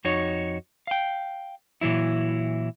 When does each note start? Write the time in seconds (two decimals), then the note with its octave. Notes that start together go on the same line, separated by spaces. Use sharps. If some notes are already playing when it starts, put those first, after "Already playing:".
0.05 F2 D#4 F#4 C#5
0.87 F5 G5
1.81 A#2 E3 F#3 E4